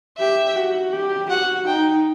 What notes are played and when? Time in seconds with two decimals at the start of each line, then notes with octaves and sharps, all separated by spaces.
0.18 G4 E5
0.56 F#4
0.92 G4
1.30 F#4 F#5
1.67 D#4 G5